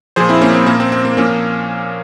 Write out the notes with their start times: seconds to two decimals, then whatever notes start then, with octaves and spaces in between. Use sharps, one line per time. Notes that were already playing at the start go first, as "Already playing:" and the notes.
0.16 A#2 F3 G#4 C5
0.29 C4 E4
0.41 A#3 C#4
0.54 C4
0.66 A#2 F3 A#3
0.80 C4
0.92 C4
1.05 A#3
1.17 A#2 F3 A#3 C#4